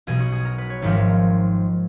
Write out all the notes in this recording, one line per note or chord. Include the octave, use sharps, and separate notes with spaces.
B1 B2 F#3 G#4
F#4
G#4
A#4
B4
C#5
G#1 G#2 F3 G#3 B4
A#4